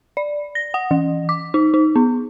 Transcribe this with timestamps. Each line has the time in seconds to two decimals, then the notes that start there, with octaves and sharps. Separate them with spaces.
0.17 D5
0.55 A#6
0.74 F#5
0.91 E3
1.29 D6
1.54 D#4
1.74 D#4
1.96 B3